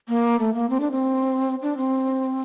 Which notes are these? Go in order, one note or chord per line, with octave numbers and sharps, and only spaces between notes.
A#3
A3
A#3
C4
D4
C4
D4
C4